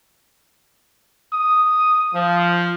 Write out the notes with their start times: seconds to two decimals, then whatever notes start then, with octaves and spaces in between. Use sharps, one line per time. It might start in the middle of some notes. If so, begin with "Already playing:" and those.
1.34 D#6
2.15 F3